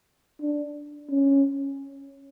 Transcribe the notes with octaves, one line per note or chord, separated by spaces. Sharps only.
D4
C#4